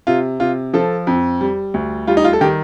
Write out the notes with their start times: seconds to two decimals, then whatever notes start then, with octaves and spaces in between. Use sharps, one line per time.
0.07 C3 F4
0.40 C3 F4
0.74 F3 A4
1.07 F2
1.41 G3
1.74 D2
2.07 G3 F4
2.17 D#4
2.24 F4
2.33 A4
2.41 D#3 G4